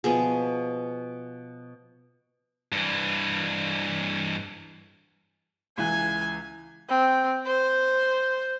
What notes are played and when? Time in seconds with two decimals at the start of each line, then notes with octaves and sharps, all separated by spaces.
0.04 B2 F3 B3 G#4
2.72 G2 E3
5.78 C#2 E3 G#5 F#6
6.89 C4
7.47 C5